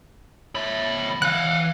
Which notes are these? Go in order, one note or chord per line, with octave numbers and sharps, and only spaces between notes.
F2 C#5 E5 B5
E3 F5 F#5 G#5 F#6